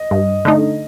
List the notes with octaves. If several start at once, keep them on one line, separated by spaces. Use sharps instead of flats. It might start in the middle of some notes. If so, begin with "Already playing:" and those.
Already playing: D#5
G2
D3 A3 D#4